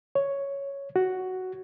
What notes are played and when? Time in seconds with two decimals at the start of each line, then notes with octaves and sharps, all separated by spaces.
0.15 C#5
0.96 F#4